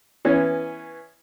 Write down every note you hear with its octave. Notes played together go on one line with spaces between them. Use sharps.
E3 B3 C#4